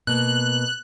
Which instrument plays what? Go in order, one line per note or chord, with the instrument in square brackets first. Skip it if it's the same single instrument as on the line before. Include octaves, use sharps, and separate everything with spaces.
[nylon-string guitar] B2 A#3 [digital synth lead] F#6